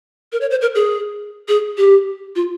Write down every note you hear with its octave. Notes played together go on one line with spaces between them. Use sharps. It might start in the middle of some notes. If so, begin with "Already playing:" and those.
A#4
C#5
C5
A#4
G#4
G#4
G4
F4